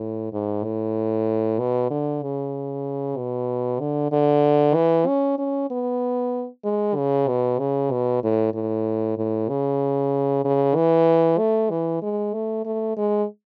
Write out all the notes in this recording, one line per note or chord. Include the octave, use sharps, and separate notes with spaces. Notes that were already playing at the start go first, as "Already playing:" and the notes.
Already playing: A2
G#2
A2
B2
D3
C#3
B2
D3
D3
E3
C#4
C#4
B3
G#3
C#3
B2
C#3
B2
A2
A2
A2
C#3
C#3
E3
A3
E3
G#3
A3
A3
G#3